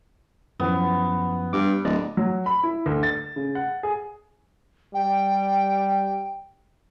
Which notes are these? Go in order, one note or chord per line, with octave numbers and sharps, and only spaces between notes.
F#2 E3 F3 B3
G2 D6
D1 E4 D5 D#5
F#3
B5
E4
D2
A6
C#3
F#5
G#4
G3 G5